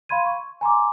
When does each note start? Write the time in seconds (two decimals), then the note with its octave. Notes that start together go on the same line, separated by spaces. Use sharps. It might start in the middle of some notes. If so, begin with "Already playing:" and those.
0.09 F5 B5 C6 G#6 D#7
0.26 C#6
0.61 G#5 A#5 C6 D6